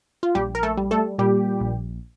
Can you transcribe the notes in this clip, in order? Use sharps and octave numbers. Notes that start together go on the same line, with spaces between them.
F4
A#1 G3 G4
A#4
A3 A4
G3
A3 A4
A#2 G3 G4
A#1